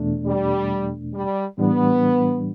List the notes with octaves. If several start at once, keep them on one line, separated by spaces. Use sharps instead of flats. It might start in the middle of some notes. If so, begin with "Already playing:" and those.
Already playing: E2 B2 A3 D4
G3
G3
A2 E3 G3 B3 D4